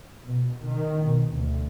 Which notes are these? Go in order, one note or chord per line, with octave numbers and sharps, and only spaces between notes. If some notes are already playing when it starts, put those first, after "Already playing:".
B2
D#3
B2
D2